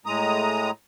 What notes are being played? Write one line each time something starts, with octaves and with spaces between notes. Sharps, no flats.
A2 G#3 A#5 D#6